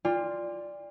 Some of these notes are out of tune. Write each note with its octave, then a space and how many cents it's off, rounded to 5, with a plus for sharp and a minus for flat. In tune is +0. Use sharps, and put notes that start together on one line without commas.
F4 +0 D5 +0 G5 +45